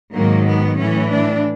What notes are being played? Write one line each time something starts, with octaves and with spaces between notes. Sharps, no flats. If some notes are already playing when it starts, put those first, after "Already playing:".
G#2 D#3 F#3 A#3
B3
A2 E3 C#4
D4